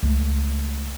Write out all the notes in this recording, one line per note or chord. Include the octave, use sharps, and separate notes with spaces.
C#2 A3